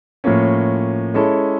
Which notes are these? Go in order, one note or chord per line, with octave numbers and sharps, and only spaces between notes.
A2 F3 A#3 C#4
G#3 C#4 E4 A4